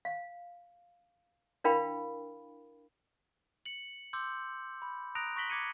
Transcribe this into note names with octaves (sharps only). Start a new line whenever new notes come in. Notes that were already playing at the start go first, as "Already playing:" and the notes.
F5
D4 E4 A#4 F5 G5 B5
C#7 F#7
C6 D6 E6 G6
B5
A#5 D#6 F#6 A#6 D7 F7
C#6 F#6 A#6 B6 F#7 G7
D6 G#6 C#7 D#7